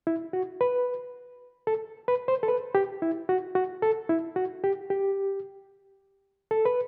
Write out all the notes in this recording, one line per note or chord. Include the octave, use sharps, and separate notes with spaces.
E4
F#4
B4
A4
B4
C5
A4
B4
G4
E4
F#4
F#4
A4
E4
F#4
G4
G4
A4
B4